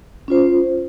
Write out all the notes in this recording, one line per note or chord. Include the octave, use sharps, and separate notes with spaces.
C#4 F4 C5